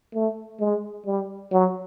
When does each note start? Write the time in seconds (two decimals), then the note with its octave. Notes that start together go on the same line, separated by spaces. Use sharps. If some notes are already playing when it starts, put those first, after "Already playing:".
0.14 A3
0.60 G#3
1.06 G3
1.52 F#3